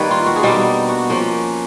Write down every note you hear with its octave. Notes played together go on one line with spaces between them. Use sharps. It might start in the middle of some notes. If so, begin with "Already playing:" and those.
Already playing: D#3 G3 A#3 G4 B4 C#5
F4
F#4
G#4
B2 G3 A#3 D4 G4
F#4
F3 A#3 C#4